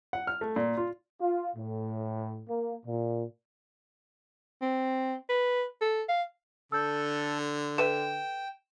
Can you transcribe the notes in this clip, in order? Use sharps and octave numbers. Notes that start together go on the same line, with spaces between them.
F#5
F6
A3
A#2
F4
F4
A2
A#3
A#2
C4
B4
A4
F5
D3 A4 E6 G6
A4 B4 E5 G5 E7